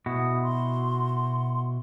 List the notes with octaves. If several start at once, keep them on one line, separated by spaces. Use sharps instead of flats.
B2 E4 F#4 D#6
C6